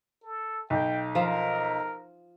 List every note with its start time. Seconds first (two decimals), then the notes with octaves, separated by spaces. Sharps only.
0.23 A4
0.70 B1 G5
1.15 F3 F4 A#4